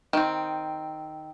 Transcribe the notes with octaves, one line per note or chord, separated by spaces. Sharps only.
D#3 C4